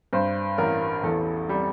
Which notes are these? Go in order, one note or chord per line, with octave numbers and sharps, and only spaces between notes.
G2 C5
A1 A#4
E2 A4
G3